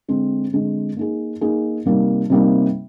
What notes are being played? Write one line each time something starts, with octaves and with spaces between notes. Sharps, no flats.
D3 G#3 C4
D3 G#3 C4
A#3 D#4 G#4
A#3 D#4 G#4
C3 G3 A#3 D#4
C3 G3 A#3 D#4